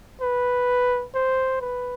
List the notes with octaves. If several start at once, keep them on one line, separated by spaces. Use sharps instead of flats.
B4
C5
B4